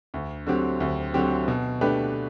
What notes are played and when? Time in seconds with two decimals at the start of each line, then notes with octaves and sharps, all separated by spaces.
0.14 D2
0.47 D3 F#3 C4 G4
0.80 D2
1.14 D3 F#3 C4 G4
1.48 B2
1.81 A3 D4 G4 B4